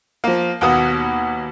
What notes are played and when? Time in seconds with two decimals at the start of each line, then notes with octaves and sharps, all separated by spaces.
0.24 F3 A#3
0.61 D#2 B2 A#3 B3 D#6